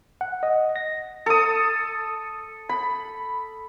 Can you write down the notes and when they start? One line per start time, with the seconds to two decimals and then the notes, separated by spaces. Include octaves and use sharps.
0.21 F#5
0.43 D#5
0.76 A#6
1.26 A4 D#6
2.69 B5